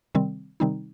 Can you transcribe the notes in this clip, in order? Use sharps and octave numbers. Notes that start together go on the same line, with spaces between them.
C3 D#3 G3 C4
C3 D#3 G3 C4 D#4